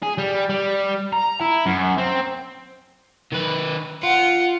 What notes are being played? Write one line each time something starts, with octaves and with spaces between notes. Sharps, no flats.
G#4
G3
G3
A#5
E4
F#2
C4
D#3 B4
F4 F#5